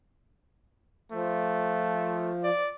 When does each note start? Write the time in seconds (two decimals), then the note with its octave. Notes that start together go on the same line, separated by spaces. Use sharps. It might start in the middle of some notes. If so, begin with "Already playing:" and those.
1.12 F3 A3
2.44 D5